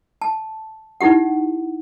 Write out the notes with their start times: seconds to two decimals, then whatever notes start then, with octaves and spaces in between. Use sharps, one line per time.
0.22 A5
1.01 D#4 E4 G4 F#5